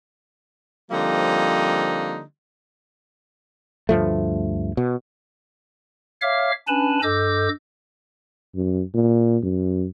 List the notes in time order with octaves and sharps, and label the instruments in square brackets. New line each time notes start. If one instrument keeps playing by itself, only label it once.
[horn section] D3 F3 G3 A#3 C4 D#4
[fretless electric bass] D2 G2 F3 A3
B2
[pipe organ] C#5 E5 F5 D6 F6
C#4 D4 B4 G#5 A5 B5
G2 A4 D#5 D6 E6 G6
[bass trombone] F#2
A#2
F#2